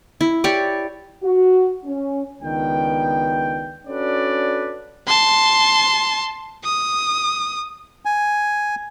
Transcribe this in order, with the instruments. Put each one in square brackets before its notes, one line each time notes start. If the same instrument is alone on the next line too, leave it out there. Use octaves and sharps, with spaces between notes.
[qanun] E4
G4 C#5 D5
[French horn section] F#4
C#4
[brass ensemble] C#2 D#3 B3 D4 G5
C#4 D4 F#4 A4 B4 D5
[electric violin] A5 C6
D#6
[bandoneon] G#5